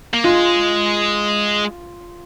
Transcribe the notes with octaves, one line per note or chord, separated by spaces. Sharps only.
A#3
G#3 F4